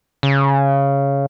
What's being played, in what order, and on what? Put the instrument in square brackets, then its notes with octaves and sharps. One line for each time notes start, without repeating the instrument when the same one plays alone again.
[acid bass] C#3